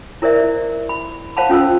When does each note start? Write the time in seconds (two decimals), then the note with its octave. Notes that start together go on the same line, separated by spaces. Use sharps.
0.22 E4 A#4 C5 D5 E5
0.89 B5
1.37 C5 F5 F#5 A5 B5
1.49 C#4 F4 A4 C5 E6